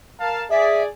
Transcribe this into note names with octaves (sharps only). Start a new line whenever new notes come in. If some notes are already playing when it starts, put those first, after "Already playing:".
A#4 F5 A5
G#4 D5 E5